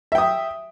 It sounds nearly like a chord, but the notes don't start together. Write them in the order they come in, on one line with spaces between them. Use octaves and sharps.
E5 G5 D#6